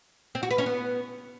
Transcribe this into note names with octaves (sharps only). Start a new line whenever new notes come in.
C4
F#4
B4
C#4
B3